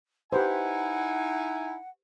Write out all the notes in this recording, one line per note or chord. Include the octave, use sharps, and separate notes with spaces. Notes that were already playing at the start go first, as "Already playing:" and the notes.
D#4 E4 G4 B4 C5 F#5 G#5